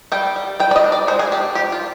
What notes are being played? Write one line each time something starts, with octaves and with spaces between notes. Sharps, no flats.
G3 G5
G3
G3 G5
D5
D#5
D4
D5
G#3 C5
G#4
D4 G4
F3 G4
F4